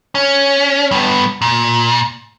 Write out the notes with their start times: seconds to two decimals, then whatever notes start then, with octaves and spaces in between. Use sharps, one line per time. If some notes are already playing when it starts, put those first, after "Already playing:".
0.15 C#4
0.91 G2 B3
1.42 A#2